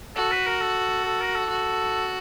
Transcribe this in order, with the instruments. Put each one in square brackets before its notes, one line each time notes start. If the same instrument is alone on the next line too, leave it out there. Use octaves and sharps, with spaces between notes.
[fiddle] F#4 [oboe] A4
[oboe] B4
A#4
A4
A4
A#4
A4
[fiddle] F#4